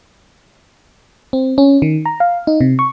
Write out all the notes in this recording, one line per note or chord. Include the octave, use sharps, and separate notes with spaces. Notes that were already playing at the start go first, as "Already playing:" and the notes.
C4
C#4
D#3
A#5
F5
D#4
C3
C#6